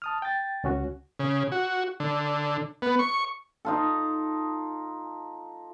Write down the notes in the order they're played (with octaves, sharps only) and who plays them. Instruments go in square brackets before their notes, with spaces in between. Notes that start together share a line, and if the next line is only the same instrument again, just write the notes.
[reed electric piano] A5 D#6 F6
G5 A6
C#2 C#4 F#4
[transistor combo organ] C#3
F#4
D3
B3
C#6
[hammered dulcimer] D#4 F4 A4